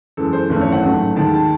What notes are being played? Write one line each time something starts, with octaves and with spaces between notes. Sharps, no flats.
F#2 E3 G#3 A4
C5
G#1 F#2 E3 A3 C5
C#5
F#5
A1 G#2 F#3 A3
D#2 D#3 G#3 A5
A5